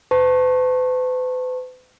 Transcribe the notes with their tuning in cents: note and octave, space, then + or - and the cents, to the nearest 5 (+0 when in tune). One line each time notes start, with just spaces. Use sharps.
B4 +45 A5 +15 C#6 -25